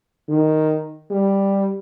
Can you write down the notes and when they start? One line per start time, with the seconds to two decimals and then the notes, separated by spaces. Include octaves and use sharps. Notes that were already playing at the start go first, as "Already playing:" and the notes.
0.29 D#3
1.10 G3